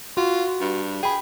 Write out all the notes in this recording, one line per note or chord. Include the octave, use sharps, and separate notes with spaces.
F4 F#4
G2
G#4 G5 B5